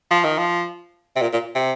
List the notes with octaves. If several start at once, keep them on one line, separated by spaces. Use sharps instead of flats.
F3
D#3
F3
C3
A#2
A#2
C3